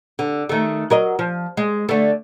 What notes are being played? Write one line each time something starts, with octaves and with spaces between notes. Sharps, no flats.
D3
D#3 A3
F#3 A#4 D#5
F3
G#3
D3 A3